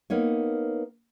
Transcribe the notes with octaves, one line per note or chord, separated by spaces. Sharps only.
A#3 B3 D#4 C#5